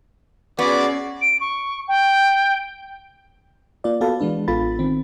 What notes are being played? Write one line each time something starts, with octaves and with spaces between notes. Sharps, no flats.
B3 C#4 F#4 G#4 D5
D7
C#6
G5
A#3 F4 D5
B3 F#4 A4 B4 F5 A5
E3 G#3 D4 B4
A1 B3 F4 A4 B5 A6
D#3 C4